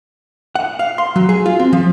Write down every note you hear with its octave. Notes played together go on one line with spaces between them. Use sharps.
F#5
F5
C6
F#3
G#4
F4
C4
F3